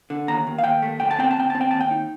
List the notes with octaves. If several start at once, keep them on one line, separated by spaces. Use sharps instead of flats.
D3
D#2 A#5
D#2
F5
D#2 G5
A3
D2 G5
A5
C4 G5
A5
D2 G5
C4 A5
G5
D#2 A5
G5
D#4